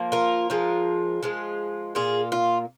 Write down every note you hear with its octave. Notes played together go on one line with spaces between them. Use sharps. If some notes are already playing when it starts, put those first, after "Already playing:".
Already playing: F3 A#3
F4 A#4
F3 G#3 F4
F3 G#3 F4
A#2 A#3 F4 G#4
F4